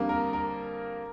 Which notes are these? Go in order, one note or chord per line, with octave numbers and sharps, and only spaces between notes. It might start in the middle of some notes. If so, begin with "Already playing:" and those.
Already playing: F2 D3 G3 A#3
A#4
A#4